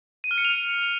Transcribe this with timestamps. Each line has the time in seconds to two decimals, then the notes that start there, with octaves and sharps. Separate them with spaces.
0.24 D#7
0.31 F6
0.38 C#7
0.45 F7